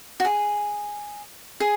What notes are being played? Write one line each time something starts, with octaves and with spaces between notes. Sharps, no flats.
F#4
G#4
G#4